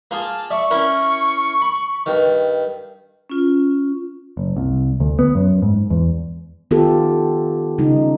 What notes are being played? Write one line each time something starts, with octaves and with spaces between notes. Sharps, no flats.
A#3 F4 G#4 A5
D5 E5 C#6
C#4 E4 A#4
B5
G2 D#3
C#4 F4
F#1
C2
D2
B3
F#2
G#2
E2
D#3 B3 F4 G4 A4
C#3 G3 D#4